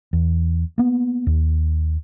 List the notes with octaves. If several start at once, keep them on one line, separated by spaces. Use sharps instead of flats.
E2
A#3 B3
D#2